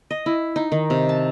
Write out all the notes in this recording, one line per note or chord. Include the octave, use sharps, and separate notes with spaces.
D#5
E4
D#4
D#3
C3
A5